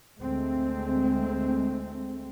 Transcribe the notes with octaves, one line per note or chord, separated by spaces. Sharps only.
D2 G#3 A3 C4